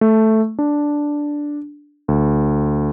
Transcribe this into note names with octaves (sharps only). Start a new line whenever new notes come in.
A3
D4
D2